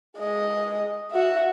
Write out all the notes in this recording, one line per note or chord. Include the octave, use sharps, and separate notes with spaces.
G#3 D#5
F#4 E5